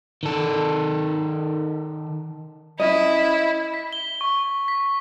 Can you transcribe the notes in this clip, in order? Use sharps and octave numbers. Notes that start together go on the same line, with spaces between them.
D#3 A4
C#4 E4 D#5
B6
G7
C#6
B6